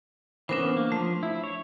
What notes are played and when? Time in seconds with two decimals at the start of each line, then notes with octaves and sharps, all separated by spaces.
0.49 E3 B3 C#4 D4 A#4 C5
0.77 A#3
0.92 F3 A3
1.23 E4
1.44 C#5